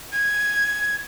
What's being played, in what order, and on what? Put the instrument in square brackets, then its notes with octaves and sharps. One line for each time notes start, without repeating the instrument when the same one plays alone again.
[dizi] G#6